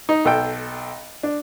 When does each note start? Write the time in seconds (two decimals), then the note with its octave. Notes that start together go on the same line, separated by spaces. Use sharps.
0.09 D#4
0.25 B1 A4 G5
1.23 D4